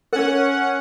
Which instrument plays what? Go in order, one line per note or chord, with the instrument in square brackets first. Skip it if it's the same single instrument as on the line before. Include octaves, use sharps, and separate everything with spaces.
[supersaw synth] C#4 F#5 [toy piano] A#4